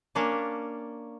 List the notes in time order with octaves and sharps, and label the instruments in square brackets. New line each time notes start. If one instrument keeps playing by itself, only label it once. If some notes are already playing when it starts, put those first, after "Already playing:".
[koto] A#3 C#4 D4 A5